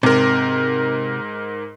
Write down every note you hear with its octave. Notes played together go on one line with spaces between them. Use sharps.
G#2 C3 A#4